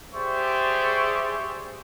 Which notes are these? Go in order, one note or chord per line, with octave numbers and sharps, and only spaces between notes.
G4 G#4 C5 D5 E5 C#6